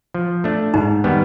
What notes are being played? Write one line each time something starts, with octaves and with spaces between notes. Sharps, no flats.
F3
A3 D4
G#2 D#4
D#3 G3 B3